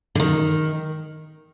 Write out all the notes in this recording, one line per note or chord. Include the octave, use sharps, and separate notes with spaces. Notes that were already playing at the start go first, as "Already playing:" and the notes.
D3
D#3